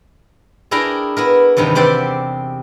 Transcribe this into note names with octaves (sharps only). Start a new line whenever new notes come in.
D4 E4 G#4 A#4 G5 A#5
B3 E4 A#4
E2 G2 C3 D#3 B4
C4 G4 C5 D5 E5 F#5